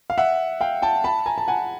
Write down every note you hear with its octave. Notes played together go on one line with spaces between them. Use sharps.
F5
E5 F#5
F5 G5
G5 A5
A5 B5
G#5 A#5
A5
F#5 G#5